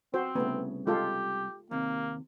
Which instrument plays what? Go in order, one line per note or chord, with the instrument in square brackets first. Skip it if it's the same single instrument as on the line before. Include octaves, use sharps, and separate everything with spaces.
[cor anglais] C4 [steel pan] F#4 C5
[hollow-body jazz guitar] C2 C#3 [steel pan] A3 B3
[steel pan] G#3 F4 A4 [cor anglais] G4
[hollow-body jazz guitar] D#2 C3 [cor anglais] A#3